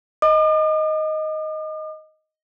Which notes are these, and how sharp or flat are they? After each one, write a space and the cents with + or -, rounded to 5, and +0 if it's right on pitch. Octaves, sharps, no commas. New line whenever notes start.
D#5 +5 D6 +45